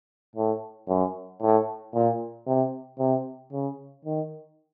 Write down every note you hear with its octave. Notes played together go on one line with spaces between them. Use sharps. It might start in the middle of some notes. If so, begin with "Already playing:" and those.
A2
F#2
A2
A#2
C3
C3
C#3
D#3